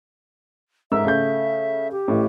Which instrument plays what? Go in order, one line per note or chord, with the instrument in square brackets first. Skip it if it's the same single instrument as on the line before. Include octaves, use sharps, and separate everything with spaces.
[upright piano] G#2 A#4 E6 [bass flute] E5
[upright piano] C#3 A3 G6
[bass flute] G4
[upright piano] A1 A2